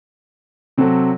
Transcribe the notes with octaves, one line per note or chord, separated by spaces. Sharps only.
C3 F#3 C4 F#4 A4